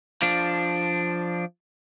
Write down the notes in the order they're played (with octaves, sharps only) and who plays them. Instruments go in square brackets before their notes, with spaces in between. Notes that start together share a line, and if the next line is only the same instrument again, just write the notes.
[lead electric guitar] F3 D4